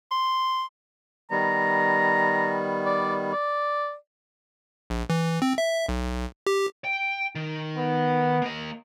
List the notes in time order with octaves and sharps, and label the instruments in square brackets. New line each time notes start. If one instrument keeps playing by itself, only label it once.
[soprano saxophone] C6
[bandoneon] D#3 G3 B3 [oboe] A#5
[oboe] D5
D5
[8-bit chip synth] A#1
E3
C4
E5
B1
G4
[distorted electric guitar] G5
D#3
[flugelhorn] B3
[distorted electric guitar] A#3 D#5